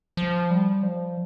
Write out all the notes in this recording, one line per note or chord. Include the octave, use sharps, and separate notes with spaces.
F3
G3
F3